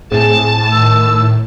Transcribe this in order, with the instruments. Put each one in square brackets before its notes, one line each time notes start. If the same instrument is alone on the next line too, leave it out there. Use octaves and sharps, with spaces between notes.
[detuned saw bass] A2 [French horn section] G#3 C4 G#4 [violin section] A5
[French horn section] D#3 [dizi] E6